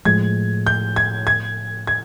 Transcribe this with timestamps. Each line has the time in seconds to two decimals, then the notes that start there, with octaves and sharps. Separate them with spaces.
0.05 A2 F3 G#3 G#6
0.67 G6
0.96 G#6
1.27 G#6
1.87 G#6